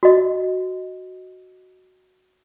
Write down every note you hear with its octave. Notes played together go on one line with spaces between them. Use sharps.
F#4 D#5